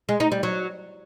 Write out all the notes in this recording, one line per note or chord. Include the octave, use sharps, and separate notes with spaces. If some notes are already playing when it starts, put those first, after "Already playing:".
G#3
D#4
G3
F#3